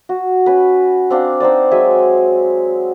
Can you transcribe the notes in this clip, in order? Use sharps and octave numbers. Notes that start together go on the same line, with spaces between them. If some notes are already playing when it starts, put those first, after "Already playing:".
F#4
C#4 B4
C4 D4 F5 F#5
C4 D#4 C5 D5
F#3 G#3 E5 G#5